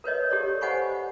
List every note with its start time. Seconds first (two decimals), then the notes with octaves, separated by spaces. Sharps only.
0.04 A#4 B4 C#5 D#5
0.30 G4 A4 C#5 D5
0.61 C5 D#5 F#5 G#5 B5 C#6